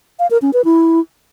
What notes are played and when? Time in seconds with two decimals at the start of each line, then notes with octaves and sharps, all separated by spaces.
0.19 F5
0.31 A#4
0.42 C#4
0.53 B4
0.65 E4